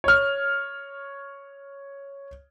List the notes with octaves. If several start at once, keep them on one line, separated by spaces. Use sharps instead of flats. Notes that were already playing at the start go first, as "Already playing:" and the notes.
C#5 F6